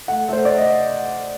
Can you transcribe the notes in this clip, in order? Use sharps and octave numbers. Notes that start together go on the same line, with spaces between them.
A3 F#5
A3 C5
A3 D5
D#5